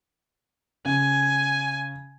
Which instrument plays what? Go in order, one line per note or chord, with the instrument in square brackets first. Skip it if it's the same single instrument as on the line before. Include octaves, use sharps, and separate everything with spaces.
[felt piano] C#3 [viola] G#5